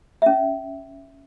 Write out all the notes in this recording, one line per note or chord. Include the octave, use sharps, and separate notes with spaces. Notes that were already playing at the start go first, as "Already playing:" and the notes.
C#4 E5